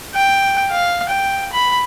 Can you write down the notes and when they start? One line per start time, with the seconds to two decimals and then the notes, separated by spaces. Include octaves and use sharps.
0.15 G5
0.72 F5
1.09 G5
1.53 B5